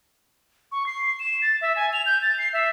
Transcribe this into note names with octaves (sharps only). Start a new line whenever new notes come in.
C#6
C7
E7
A6
E5
G#5
F7
G6
A6
C7
E5